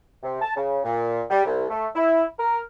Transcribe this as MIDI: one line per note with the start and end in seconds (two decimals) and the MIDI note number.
0.23 0.40 48
0.42 0.52 81
0.56 0.79 49
0.84 1.22 46
1.30 1.44 55
1.45 1.65 36
1.70 1.87 57
1.95 2.24 64
2.39 2.60 70